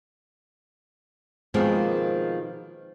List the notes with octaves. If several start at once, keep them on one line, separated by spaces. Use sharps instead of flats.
B2 D#3 F3 G#3 A#3 C4